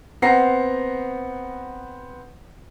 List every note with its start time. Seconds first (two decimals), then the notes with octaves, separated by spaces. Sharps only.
0.22 B3 C4 F#5 A#5 A#6 C7